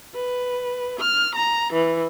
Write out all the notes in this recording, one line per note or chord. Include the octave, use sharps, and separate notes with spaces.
B4
F6
A#5
E3